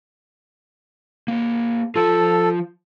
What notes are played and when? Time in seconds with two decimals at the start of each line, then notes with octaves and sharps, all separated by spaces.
1.28 A#3 G#4
1.96 F3 F4 A4